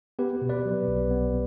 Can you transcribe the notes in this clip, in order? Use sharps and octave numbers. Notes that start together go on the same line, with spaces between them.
B3 G4 B4
B2
B4 D5
F#3
B1
B3